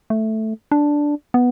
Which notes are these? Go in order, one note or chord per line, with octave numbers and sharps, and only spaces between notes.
A3
D4
B3